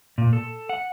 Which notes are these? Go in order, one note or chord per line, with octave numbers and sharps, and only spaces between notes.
A#2
A4
F#5